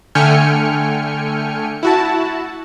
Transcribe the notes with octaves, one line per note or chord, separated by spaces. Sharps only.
D3 A3 G5 G#5 F6 C#7
E4 F#4 A5